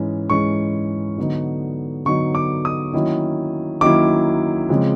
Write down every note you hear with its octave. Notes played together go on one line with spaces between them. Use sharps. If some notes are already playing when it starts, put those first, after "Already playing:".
Already playing: G#2 E3 G#3 C#4
G#2 E3 G#3 C#4 C#6
D3 F#3 B3 D#4
D3 F#3 B3 D#4 C#6
D6
D#6
D#3 F#3 A#3 C#4 E4
D#3 F#3 A#3 C#4 E4 D6
C#3 F3 G#3 C4